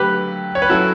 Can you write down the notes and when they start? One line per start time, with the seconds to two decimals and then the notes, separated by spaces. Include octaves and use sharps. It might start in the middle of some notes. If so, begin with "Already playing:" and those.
Already playing: D3 F#3 A3 G4 B4
0.55 C#5
0.62 B4
0.70 F#3 C#4 E4 F#4 A4